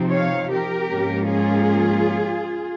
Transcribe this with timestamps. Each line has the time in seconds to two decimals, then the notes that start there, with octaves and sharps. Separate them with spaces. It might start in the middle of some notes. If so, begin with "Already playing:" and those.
Already playing: C3 F3 C4 D#4
0.11 C#5 F5
0.50 G4 A#4
0.90 G#2 F3 A#3 C#4
1.28 F4 G#4